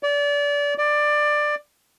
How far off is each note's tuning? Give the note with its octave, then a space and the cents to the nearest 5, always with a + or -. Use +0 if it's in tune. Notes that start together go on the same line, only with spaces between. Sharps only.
D5 -30
D5 +15